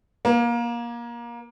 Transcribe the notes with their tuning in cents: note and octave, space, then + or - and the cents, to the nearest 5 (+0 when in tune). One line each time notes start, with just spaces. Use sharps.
A#3 +25